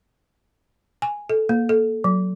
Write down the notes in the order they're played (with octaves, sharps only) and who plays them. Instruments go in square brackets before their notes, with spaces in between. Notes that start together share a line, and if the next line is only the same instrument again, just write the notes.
[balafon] G#5
A4
A#3
A4
F#3